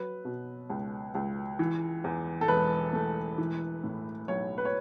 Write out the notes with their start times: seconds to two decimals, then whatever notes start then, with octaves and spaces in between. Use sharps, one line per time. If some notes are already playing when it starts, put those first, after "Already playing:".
Already playing: F#3 B4
0.25 B2
0.70 C#2
1.15 C#2
1.59 E3
2.04 E2
2.41 A4
2.48 E1 B4
2.93 A3
3.38 E3
3.84 A2
4.28 B1 C#5
4.58 B4
4.65 C#5